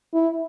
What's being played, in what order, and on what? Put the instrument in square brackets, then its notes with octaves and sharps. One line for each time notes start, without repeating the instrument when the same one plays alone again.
[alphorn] E4